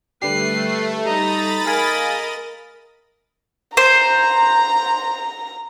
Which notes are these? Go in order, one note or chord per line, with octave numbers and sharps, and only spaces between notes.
D3 G3 A3 G4 B4 C7
G3 D#4 D#5 A#5 B5 A6
G#4 A#4 D#5 F5 G#5
C5 A#5